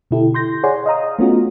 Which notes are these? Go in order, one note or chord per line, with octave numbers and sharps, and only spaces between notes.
B2 D3 E4 G4 A4
C6 G6 A#6
G#4 C#5 D5 F#5 G#5 C6
D#5 F5 A#5 D#6
A3 B3 C#4 F4 F#4